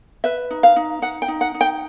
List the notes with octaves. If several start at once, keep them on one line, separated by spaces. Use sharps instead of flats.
B4 E5
D#4
F5
D#4
D#4 F#5
G5
D#4
F#5
D#4
G5